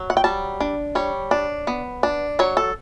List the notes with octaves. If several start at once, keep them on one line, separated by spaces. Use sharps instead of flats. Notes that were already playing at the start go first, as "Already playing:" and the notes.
Already playing: F#3
F#5
G5
G3 A5
D4
G3 C#5
D4
B3
D4
F#3 C#5
A4